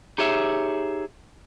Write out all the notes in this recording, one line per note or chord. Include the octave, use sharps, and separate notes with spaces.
D#4 G4 G#4 C#5 E5